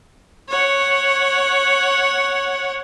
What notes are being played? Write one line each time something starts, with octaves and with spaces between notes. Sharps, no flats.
C#5 F#5